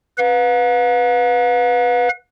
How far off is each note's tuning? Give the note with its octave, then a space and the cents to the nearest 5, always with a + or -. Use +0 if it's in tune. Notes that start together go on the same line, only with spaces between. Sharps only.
B4 +0 F5 +45